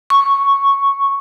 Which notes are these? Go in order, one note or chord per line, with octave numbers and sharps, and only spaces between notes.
C#6